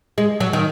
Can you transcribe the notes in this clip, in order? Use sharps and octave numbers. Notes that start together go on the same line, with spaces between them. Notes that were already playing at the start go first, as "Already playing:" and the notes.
G#3
F#3
D#3